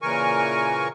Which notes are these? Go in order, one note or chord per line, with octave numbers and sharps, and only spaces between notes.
A#2 C#3 E3 A#4 G#5 C#6